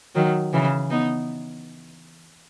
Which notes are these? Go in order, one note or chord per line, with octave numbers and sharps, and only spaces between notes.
D#3 F#3
C#3 E3
B3 D#4